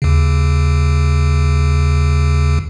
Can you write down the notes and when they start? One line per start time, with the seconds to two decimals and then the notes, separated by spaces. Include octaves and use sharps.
0.02 D#2 C#3